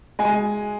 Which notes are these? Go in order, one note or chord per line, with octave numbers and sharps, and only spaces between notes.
G#3 G#5